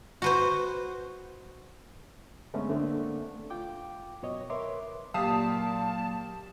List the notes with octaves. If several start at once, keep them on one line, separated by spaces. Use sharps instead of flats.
F#4 B4 C5
G2 D3 G#3 A3 B3 C#4
D3 A3 A#3 C4 D4
F4 G5 D6
F#2 B2 C#5 D#5
A#4 B4 C#5 E5 C6 D6
A#2 F#3 A#3 G4 F5 A5 D#6